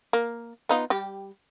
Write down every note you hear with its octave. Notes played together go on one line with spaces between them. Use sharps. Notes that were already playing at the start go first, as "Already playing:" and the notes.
A#3
B3 D#4 F4
G3 G4